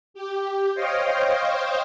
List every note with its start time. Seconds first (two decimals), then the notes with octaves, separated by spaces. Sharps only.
0.14 G4
0.74 C5 C#5 D#5 F5 G5